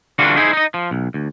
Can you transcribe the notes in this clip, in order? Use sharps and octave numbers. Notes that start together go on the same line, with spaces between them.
D3 E3 G3 D4 F4 F#4
D#4 E4 G#4 C5
D#4 D#5
F3
B1
D2